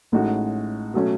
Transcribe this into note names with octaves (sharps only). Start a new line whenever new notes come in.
A1 A2 G#3 D#4 F#4
B2 F#3 A3 C#4